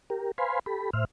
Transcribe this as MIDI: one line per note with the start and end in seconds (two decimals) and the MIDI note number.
0.10 0.32 67
0.10 0.32 70
0.38 0.59 71
0.38 0.59 72
0.38 0.59 77
0.38 0.59 80
0.38 0.59 83
0.38 0.59 84
0.66 0.90 67
0.66 0.90 69
0.66 0.90 83
0.93 1.05 45
0.93 1.05 72
0.93 1.05 76
0.93 1.05 89